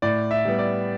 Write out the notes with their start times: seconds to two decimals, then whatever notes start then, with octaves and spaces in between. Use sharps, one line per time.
0.02 A2 D5
0.31 E5
0.45 G3 B3
0.59 D5